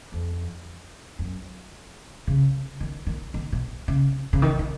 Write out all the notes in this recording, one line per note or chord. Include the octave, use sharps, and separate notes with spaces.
F2
F#2
C#3
D#3
D#3
D#3
B2
C#3
C#3
D#3
D#3